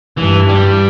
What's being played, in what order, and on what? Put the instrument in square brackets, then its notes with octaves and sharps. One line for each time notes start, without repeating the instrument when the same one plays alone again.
[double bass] G2 [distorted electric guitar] E3
[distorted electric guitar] G3